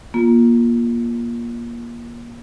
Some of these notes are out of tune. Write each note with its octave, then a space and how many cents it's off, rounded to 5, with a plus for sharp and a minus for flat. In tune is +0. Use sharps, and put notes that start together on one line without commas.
A#3 +25 F4 +0